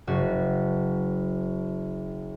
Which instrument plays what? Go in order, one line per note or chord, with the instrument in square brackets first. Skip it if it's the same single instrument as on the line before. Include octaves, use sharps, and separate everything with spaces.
[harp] F#1 F#4